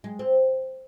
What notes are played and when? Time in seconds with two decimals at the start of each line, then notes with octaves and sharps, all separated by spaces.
0.04 G#3
0.19 C4